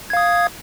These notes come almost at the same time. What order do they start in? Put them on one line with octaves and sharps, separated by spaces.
G#6 F5 D#6